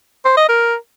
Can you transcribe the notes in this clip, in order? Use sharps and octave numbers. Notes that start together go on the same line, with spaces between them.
C5
D#5
A#4